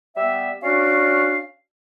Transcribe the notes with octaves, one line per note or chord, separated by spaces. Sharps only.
G3 B3 E5
C#4 D4 F#4 D5 F5